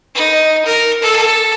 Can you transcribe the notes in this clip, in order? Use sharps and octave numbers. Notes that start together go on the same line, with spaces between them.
D#4
A#4
A4